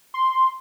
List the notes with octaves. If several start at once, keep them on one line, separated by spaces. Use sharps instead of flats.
C6